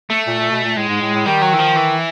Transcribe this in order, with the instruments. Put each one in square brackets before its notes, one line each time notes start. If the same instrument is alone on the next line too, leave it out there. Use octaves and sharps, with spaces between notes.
[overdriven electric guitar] A3
[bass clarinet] A#2
A#2
B2
A#2
[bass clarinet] A2 [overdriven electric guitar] G#3
[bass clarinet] G#2
A2
A2
[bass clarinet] D#3 [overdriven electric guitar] G3
[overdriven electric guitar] F#3
E3
F3
E3